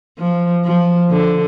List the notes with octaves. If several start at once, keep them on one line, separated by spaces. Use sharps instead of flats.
F3
F3
D3